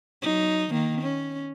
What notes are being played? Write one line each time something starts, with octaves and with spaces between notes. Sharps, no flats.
F#3 D#4
D#3 A#3
C#4